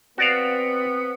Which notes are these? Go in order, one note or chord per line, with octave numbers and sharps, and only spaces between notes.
B3 C4 F#4 D5 F5